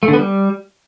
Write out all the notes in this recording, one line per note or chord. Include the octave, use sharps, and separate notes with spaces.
A3
D3
B3
G3